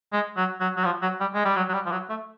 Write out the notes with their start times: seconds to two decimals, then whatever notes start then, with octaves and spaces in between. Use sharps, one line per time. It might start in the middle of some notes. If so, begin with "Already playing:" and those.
0.13 G#3
0.37 F#3
0.60 F#3
0.77 F#3
0.85 F3
1.02 F#3
1.20 G3
1.34 G#3
1.45 G3
1.56 F#3
1.69 F#3
1.74 G3
1.86 F3
1.92 F#3
2.09 A3